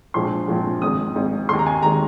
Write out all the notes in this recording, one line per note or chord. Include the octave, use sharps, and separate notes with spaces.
A#1 A#2 F3 G#3 C6
A#1 A#2 F3 G#3
G#1 G#2 D#3 G#3 D#6
G#1 G#2 D#3 G#3
D#2 D#3 G#3 C6
A#5
G#5
D#2 D#3 G#3 A#5